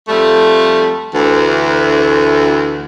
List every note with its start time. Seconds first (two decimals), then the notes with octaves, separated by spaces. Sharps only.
0.08 F2 G3 A3
1.15 D2 E3